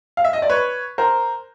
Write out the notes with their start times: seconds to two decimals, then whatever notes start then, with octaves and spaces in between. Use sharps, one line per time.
0.17 F5
0.25 E5
0.33 D#5
0.42 D5
0.49 B4 C#5
0.98 A#4 C5